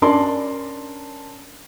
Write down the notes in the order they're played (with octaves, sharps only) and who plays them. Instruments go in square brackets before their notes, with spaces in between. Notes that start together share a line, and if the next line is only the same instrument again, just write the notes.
[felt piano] C#4 D4 A#4 D5 A5 C6